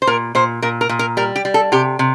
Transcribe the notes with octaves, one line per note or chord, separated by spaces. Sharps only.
C5
A#2 A#4
A#2 C5
A#2 A#4
A#4
A#2
A#4
G3 A#4
G4
G3
A4
C3 G4
C3